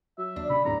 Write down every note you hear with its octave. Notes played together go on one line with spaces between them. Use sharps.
F#3 E5
D#2 D4
C3 C#4 B5
D1 D#2 G#2 A3 A#5